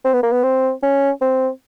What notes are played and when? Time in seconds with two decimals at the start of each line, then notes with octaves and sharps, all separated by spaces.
0.05 C4
0.13 B3
0.23 A#3
0.32 B3
0.44 C4
0.83 C#4
1.21 C4